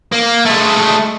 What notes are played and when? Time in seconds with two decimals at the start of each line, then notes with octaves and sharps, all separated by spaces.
0.12 A#3
0.46 G#3 A3